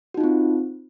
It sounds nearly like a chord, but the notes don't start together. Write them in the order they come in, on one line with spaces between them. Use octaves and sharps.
F#4 D#4 F4 C4